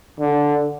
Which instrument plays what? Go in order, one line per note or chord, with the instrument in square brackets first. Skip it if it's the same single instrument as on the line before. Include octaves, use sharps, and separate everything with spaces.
[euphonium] D3